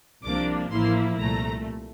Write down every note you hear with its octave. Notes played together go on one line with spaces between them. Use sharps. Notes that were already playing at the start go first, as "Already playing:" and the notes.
C2 C3 F3 A#3 D4 D6
A1 A2 F3 A#3 E4 C6
C2 A#2 A3 A#5